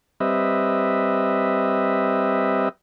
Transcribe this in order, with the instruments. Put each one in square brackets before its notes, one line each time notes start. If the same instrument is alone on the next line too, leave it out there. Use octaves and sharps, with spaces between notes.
[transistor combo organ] G3 C4 B4 D#5 E5